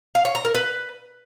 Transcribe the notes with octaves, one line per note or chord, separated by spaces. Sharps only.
F5
C#5
A#5
A#4
B4